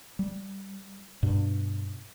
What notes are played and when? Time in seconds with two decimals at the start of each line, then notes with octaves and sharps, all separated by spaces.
0.19 G3
1.23 G2 B2